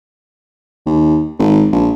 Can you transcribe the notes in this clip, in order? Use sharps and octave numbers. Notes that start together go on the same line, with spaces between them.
D#2
G#1
A#1